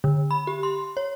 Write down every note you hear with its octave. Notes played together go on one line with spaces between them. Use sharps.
D3
B5
G4
C6
C#5